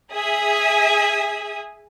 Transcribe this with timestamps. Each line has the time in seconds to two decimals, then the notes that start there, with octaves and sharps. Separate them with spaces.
0.13 G#4 E5 G#5 D#6